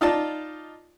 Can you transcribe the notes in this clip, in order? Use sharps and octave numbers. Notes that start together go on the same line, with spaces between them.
D#4 F4 D5 A5